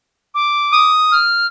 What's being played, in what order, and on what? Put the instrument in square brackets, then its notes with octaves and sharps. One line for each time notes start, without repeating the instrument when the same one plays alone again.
[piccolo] D6
[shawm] D#6
[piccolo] F6